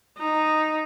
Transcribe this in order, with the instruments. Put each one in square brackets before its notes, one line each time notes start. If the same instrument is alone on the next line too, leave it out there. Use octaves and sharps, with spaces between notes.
[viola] D#4